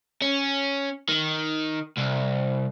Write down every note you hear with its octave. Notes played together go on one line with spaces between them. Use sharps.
C#4
D#3
C2